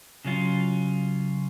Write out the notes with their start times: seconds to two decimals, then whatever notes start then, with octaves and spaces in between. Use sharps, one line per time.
0.25 C#3 F#3 C#4 F4